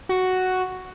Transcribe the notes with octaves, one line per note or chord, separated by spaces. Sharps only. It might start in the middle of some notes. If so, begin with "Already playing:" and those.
F#4